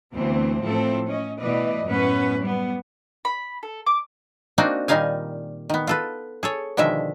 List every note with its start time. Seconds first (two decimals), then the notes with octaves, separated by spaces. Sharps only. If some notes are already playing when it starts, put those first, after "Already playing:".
0.14 D2 E3 B3 C4
0.62 A2 E3 F3 C4 A4
1.06 C#4 D#5
1.38 B2 E3 A3 B4 D5 D#5
1.86 F#2 A2 B3 C#4 B4
2.39 G3 B3
3.25 B5
3.63 A4
3.86 D6
4.58 A#3 C4 D4 D#4 F#4 D5
4.88 A#2 D#3 G3 D#4 F5 G#5
5.70 D#3 B3
5.87 F4 A4 B4
6.43 G#4 A4 C#5
6.77 B2 D3 D#3 F3 G#3 E5